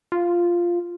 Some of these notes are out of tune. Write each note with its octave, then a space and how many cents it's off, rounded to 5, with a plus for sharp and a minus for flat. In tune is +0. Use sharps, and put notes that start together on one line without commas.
F4 -5